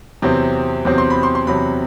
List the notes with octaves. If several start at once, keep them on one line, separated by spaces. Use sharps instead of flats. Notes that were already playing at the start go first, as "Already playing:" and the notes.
E2 C3 F#3 C4
E2 C3 F#3 C4
C6
B5
C6
C6
E2 C3 F#3 C4 B5